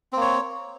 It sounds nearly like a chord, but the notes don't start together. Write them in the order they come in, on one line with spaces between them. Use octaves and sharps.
C4 A#3 C#5